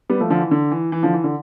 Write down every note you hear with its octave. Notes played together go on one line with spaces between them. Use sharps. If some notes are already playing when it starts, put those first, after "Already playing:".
G3 B3
F3 A3
D3 F3
E3
D3
E3
E3
D3 F3
E3
D3